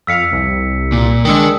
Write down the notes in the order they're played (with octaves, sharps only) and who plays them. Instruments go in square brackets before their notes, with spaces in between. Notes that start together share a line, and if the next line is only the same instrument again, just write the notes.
[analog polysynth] F2 F5 [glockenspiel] E6 B6 C#7
[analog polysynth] C2
[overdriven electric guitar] A#2
[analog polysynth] G#3 D4 C#7 [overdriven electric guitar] A#4 G5 [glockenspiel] D#6 E6